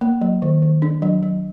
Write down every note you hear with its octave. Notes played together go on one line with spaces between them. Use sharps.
A#3
F#3
D#3
D#3
D4
F#3
F#3